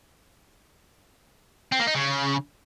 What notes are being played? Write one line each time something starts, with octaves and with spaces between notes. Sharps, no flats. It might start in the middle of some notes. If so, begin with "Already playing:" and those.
C4
A#3
D#4
C#3